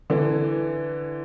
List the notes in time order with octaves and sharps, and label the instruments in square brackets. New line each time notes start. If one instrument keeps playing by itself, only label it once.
[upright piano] D3 E3